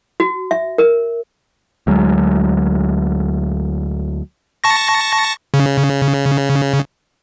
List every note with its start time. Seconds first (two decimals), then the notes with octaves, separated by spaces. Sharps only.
0.20 F#4
0.51 E5
0.78 A#4
1.87 D2 F#3 G#3
4.64 A5 C#6 A#6
5.54 C#3